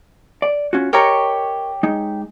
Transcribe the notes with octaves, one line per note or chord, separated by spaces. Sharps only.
D5
C#4 F4 F#4
G4 A#4 C#5 D#5 A#5 C#6
G#3 D#4